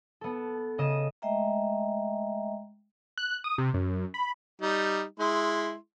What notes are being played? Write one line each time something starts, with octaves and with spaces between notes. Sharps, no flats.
B3 A4
C#3 D#5 D#6 E7
G#3 A3 D#5 E5 G5 A#5
F#6
D#6
C3
F#2
B5
G3 D#4
G#3 E4 C6